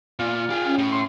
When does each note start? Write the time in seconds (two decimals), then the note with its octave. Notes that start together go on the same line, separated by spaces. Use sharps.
0.19 A#2 F4
0.50 G4 G#4
0.65 C#4
0.78 A2
0.92 C6